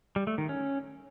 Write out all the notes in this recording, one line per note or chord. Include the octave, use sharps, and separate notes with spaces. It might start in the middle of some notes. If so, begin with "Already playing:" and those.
G3
A3
D#3
C#4